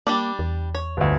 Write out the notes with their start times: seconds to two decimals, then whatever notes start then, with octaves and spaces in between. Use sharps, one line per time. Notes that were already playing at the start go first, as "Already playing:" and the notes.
0.07 G3 A#3 D4 D5
0.39 E2
0.75 C#5
0.97 G1 D2